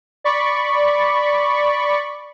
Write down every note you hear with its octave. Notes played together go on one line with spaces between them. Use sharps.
D5 B5 C#6